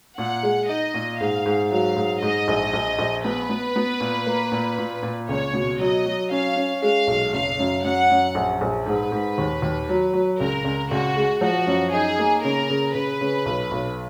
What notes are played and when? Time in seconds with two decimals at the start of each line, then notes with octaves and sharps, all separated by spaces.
0.18 A#2 F#5
0.43 G#3
0.69 D#4 D#5
0.94 A#2
1.20 G#2 F5
1.46 G#2
1.71 F#3 F5
1.96 G#2
2.22 G#2 D#5
2.48 A#1
2.73 A#1
2.99 A#1
3.24 B3 B4
3.50 B3
3.76 B3
4.00 A#2
4.27 A#3
4.52 A#2
4.78 A#2
5.03 A#2
5.29 C#2 C#5
5.54 B2
5.79 F#3 D#5
6.06 F#3
6.31 C#4 F5
6.56 C#4
6.82 G#3 F5
7.07 B1
7.33 F#1 F5
7.59 F#2
7.84 F#2 F#5
8.10 F#2
8.35 A#1
8.61 A#1
8.86 G#2 B4
9.12 G#2
9.38 D#2
9.62 D#2
9.89 F#3
10.13 F#3
10.40 C#2 A#4
10.65 C#2
10.91 C#2 F#4
11.17 G#3
11.41 F3 F#4
11.67 F#2
11.93 D#4 G#4
12.19 A#3
12.43 C#3 A#4
12.70 C#3
12.95 C#3 B4
13.21 C#3
13.46 B1
13.71 B1